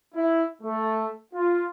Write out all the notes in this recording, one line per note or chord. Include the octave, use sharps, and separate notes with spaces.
E4
A3
F4